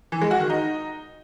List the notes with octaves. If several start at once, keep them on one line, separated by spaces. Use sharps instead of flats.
E3
G#3
F#4
D#3
D#4